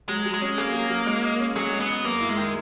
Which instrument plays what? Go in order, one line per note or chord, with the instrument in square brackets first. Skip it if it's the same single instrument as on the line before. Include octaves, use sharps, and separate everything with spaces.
[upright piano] F#3 [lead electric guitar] G#3
[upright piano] F#3
[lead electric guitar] G#3
[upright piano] C#4
[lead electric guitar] A#3 [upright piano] G#4
[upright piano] F#3
F#3
G#3
D#5
C#4
[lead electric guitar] F#3 [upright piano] G#4
[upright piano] G#3
[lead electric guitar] B3
[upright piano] D#5
[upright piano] F#2 [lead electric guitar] A#3
[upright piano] E4
[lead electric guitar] G#3
[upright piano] D#3